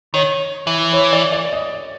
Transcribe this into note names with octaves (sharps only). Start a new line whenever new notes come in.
D#3 C#5
E3
C#5
D5
D5
D#5